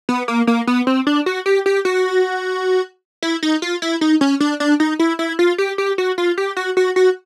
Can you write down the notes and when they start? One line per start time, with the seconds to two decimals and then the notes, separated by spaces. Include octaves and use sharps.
0.09 B3
0.28 A#3
0.47 A#3
0.67 B3
0.87 C4
1.07 D4
1.26 F#4
1.46 G4
1.66 G4
1.85 F#4
3.23 E4
3.43 D#4
3.62 F4
3.82 E4
4.01 D#4
4.21 C#4
4.40 D4
4.60 D4
4.80 D#4
4.99 E4
5.19 E4
5.39 F4
5.58 G4
5.78 G4
5.98 F#4
6.18 F4
6.38 G4
6.57 F#4
6.77 F#4
6.96 F#4